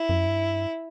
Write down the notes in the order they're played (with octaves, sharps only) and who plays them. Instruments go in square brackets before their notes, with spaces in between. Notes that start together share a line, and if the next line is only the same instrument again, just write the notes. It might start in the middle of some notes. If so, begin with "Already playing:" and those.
Already playing: [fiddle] E4
[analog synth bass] F#2
G2